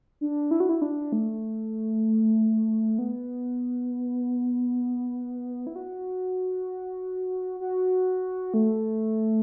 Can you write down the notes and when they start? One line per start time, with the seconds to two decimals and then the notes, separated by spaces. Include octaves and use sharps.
0.21 D4
0.51 E4
0.60 F#4
0.69 E4
0.82 D4
1.12 A3
2.99 B3
5.67 E4
5.76 F#4
7.60 F#4
8.54 A3